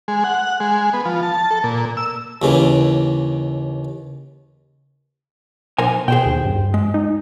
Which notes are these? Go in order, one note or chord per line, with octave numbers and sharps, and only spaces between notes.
G#3
F#5
G#3
B3
F3
A5
A4
A#2
E6
D#2 C#3 E3
B1 A#4 C5 G#5
B2 G#4 C5 G5
D#2
G2
G#3
D#4